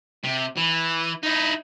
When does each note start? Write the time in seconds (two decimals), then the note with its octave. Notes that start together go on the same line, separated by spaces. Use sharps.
0.24 C3
0.57 E3
1.23 D#4 E4